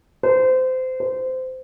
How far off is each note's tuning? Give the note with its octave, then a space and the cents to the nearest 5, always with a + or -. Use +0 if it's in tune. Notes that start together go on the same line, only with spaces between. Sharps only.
C5 -25
C5 -20